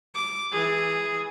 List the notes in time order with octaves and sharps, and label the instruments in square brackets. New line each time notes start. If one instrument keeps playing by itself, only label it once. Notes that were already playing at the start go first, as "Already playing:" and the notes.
[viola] D6
E3 G#4